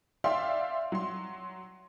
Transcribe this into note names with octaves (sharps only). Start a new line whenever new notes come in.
D5 E5 F5 G5 C6
F#3 C6